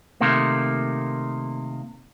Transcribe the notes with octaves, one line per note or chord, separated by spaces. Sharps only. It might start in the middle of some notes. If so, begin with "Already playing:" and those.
C3 D#3 A3 A#3